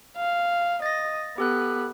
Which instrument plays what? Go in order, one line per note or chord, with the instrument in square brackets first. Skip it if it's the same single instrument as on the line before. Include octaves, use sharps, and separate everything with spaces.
[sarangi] F5
[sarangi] D#5 [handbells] A6 A#6
[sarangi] B3 [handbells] G4 A4 F#6